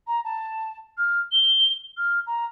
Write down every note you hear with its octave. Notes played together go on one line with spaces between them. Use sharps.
A#5
A5
F6
G7
F6
A#5